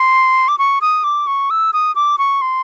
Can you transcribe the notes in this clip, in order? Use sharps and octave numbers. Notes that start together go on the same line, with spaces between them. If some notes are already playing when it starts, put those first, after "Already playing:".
Already playing: C6
D6
C#6
D#6
D6
C#6
E6
D#6
D6
C#6
C6